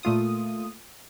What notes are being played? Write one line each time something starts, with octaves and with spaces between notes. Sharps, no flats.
A#2 A3 F4 D#6